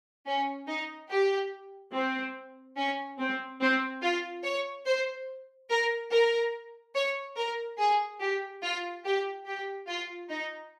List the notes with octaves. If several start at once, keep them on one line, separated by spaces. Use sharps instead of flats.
C#4
D#4
G4
C4
C#4
C4
C4
F4
C#5
C5
A#4
A#4
C#5
A#4
G#4
G4
F4
G4
G4
F4
D#4